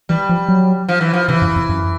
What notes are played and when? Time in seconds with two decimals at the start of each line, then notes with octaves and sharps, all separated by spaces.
0.09 E3 G3
0.29 F3
0.48 F#3
0.89 F3
1.01 E3
1.13 F3
1.28 C3 E3
1.42 F#2
1.56 F2
1.69 F#2